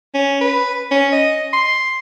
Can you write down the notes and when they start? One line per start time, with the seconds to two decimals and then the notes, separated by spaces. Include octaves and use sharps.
0.14 C#4
0.41 B4
0.91 C#4
1.12 D#5
1.53 C6